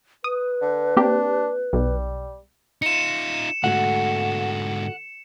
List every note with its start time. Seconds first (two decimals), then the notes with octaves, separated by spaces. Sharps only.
0.24 B4 D#6
0.61 D3
0.97 A#3 C4 D4 G4
1.73 B1 G3
2.82 D#4 F4 C#7 E7
3.64 G#2 D3 A3 F#4 F#5